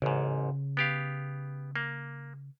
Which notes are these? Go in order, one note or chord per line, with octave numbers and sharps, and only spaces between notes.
A1 G#2 C#3
B3 G4 F5
A#3